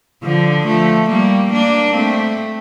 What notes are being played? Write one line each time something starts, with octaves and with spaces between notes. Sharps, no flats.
D3 F3
F3 A3
G3 A#3
A#3 D4
A3 C4